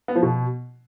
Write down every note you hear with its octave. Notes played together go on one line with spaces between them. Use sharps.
B3
F3
B2